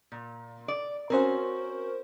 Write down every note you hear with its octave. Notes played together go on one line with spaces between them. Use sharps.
A#2
D5
C4 C#4 F#4 A#4 C5